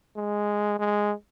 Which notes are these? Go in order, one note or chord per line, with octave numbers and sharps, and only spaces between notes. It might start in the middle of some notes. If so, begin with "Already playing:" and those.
G#3
G#3